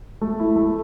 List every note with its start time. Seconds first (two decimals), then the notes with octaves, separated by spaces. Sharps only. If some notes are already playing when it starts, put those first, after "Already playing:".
0.21 A3
0.40 E4
0.56 A3